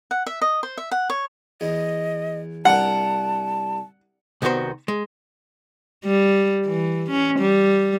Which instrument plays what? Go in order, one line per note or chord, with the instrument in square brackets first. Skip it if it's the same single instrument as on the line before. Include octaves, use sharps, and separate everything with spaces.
[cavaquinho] F#5
E5
D#5
C5
E5
F#5
C#5
[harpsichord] E2 [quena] D#5
[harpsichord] C2 D4 A#4 [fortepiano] F#5 [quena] A5
[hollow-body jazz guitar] C2 D#3 B3 F#4 C5
G#3
[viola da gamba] G3
E3
C#4
G3